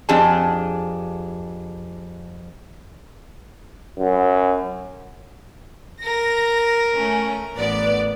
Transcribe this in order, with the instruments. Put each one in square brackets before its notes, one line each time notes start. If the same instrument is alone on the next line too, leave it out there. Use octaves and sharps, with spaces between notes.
[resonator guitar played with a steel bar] F2 D4 G4 G#4 A5
[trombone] F#2
[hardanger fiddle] A#4 [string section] A#6
[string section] A3 C#4
A1 B3 D5